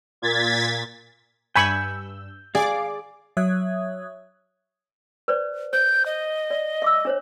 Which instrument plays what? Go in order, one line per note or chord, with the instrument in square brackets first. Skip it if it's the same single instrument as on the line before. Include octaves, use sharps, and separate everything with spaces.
[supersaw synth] A#2 G#6 A6 B6
[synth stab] G2 E6 [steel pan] G#5 B5 C#6 [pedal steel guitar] G6
[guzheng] G#4 [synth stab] D5 D6 [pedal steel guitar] F5
[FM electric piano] F#3 C#5 E5 D#6 F#6 G#6
[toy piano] B4 C5 D5
[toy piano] C5 [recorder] G6
[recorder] D#5
[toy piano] D5
E5 D6 E6
D4 C5 C#5